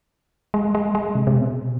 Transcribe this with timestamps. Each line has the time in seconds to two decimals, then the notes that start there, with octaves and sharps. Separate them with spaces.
0.54 G#3
0.75 G#3
0.95 G#3
1.15 C3
1.27 C3
1.36 B2